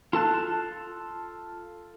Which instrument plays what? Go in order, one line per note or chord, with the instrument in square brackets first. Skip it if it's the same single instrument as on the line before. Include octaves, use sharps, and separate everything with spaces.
[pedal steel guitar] F4 A4 A5 F#6